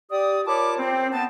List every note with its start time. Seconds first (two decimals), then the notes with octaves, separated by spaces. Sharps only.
0.11 G4 D5 D#6
0.47 F4 A#4 C#5 A5 B5 D6
0.79 C4
1.12 B3 A5